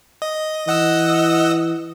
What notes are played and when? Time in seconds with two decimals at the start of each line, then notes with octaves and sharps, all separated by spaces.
0.22 D#5
0.67 E3 D#5 F#5 E6